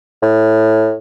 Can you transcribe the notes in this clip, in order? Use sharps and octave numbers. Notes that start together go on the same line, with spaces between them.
A2